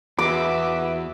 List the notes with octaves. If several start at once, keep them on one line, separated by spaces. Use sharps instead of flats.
E2 F#4 B4 E5 D6